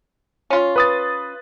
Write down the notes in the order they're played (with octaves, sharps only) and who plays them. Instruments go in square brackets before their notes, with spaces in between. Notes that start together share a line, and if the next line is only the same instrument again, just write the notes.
[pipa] C#4 F4
[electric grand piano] B4 D#6 A6